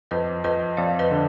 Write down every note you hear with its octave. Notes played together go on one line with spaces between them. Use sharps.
F2 B4 D#5
F2 B4 D#5
F2 D5 F5
B4 D#5
D3